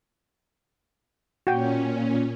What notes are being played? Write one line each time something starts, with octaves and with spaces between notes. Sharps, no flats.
A#2 C#4 F#4 G5